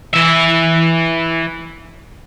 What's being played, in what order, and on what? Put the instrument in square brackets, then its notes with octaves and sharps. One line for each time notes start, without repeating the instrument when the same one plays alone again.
[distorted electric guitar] E3 E5